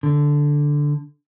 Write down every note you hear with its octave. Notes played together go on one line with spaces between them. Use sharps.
D3